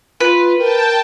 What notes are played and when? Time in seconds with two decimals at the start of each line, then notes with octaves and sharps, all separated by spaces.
0.20 F4 B4
0.59 A#4 G5 A5